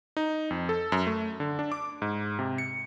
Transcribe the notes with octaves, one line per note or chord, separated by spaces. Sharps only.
D#4
F2
A4
F#2
A3
D3
D4
D6
G#2
C3
C#7